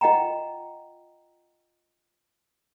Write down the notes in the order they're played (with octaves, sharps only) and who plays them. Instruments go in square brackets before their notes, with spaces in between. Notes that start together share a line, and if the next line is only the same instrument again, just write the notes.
[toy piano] F4 D#5 F#5 G5 A#5